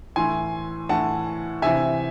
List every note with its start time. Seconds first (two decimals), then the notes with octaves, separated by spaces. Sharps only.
0.16 A2 E3 G#5 C6
0.89 A2 E3 F#5 A5
1.62 C3 E3 E5 G#5